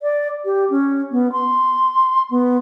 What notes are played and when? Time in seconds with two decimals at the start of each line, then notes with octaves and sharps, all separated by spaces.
0.02 D5
0.45 G4
0.70 C#4
1.11 B3
1.32 C6
2.30 B3